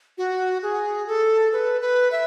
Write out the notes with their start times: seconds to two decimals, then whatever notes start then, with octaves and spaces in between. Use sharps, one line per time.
0.18 F#4
0.63 G#4
1.07 A4
1.53 B4
1.81 B4
2.12 E5